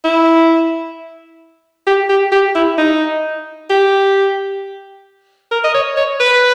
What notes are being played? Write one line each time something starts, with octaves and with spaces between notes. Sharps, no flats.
E4
G4
G4
G4
E4
D#4
G4
A#4
D#5
C#5
C#5
B4